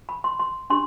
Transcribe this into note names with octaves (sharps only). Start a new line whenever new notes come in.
B5
C6
C6
D4 G4 C6